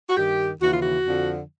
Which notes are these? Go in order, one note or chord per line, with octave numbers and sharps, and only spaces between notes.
F#4
G2 D#3 G4
D#2 C#3 E3 F#4
F4
F#4
F2 D3 F3